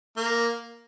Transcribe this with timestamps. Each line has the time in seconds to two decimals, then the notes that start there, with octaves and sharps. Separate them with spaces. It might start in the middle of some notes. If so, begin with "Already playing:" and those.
0.17 A#3